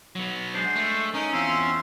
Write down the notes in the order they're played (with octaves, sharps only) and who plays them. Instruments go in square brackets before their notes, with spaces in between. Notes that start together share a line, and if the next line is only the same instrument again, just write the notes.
[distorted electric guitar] F#3 B3
[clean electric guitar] G#3 D4 [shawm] C5
[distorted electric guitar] A3
[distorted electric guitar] C#4 [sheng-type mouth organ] D#4 A#4 D#6
[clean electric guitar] E2 C4 [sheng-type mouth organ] F4 C6 [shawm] E5